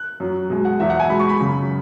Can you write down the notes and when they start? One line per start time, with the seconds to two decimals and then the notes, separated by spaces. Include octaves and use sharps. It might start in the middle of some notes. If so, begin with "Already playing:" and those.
Already playing: F#6
0.20 F#2 F#3
0.50 B2 G#3
0.65 F#5
0.80 E2 B2 F#3 E5
0.90 F#5
1.00 G#5
1.10 B2 G#3 B5
1.19 C#6
1.29 B5
1.40 F#2 C#3 F#3